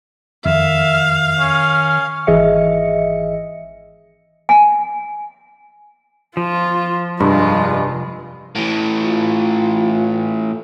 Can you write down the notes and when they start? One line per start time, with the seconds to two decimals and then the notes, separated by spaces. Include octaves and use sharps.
0.46 F2 D#3 E5 F5
1.40 C#4
2.27 G#1 E3 G#4 D#5 E5 C#7
4.49 G#5
6.37 F3 F4
7.20 F1 G2 G#3 F4
8.56 A2 E3
9.04 F4